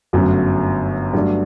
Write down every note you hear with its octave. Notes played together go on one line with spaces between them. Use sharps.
G1 F#2 F#3 A3
G2 F#3 A3 D4